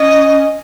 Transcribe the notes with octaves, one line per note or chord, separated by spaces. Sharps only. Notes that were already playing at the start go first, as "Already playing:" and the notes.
Already playing: C#4 D#5